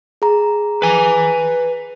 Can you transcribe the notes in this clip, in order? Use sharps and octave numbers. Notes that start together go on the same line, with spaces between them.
G#4 A#5
B4 G#5